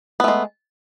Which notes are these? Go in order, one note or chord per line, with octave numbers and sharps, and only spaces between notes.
G#3 A3 B3